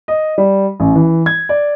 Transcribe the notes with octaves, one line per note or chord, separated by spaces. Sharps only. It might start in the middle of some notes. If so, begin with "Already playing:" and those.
D#5
G3
A1
E3
G#6
D5